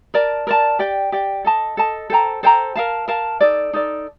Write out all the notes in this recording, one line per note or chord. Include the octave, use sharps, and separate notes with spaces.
A#4 D5 A5
A#4 D5 A5
G4 D5 G5
G4 D5 G5
A4 D#5 A5
A4 D#5 A5
A4 C5 G5 A#5
A4 C5 G5 A#5
A#4 F5 A5
A#4 F5 A5
D#4 A4 D5
D#4 A4 D5